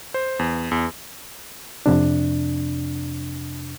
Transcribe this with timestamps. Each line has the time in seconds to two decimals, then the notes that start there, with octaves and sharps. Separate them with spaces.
0.14 C5
0.39 E2
0.71 E2
1.86 F2 C3 D4